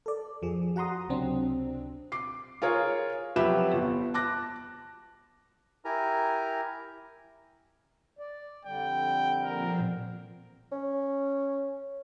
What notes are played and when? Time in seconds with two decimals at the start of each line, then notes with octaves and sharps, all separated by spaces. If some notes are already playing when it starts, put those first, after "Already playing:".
0.06 A4 D5
0.42 F2 F3 G#4
0.76 F#4 F#5 A#5 C6 D#6
1.09 C#2 C3 F#3 C4 D4
2.12 D6 C7
2.62 F4 G#4 A#4 C#5
3.36 F2 F#3 G4 B4 E5 E7
3.73 G1
4.14 A5 D6 F#6 A#6
5.85 E4 G4 A#4 G#5 A#5
8.19 D5
8.65 F2 D3 G3 G5
9.43 A#2 F3 C4 A#4
10.72 C#4